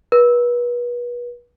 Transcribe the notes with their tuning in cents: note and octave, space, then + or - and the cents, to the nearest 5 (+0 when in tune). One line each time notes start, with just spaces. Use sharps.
B4 -35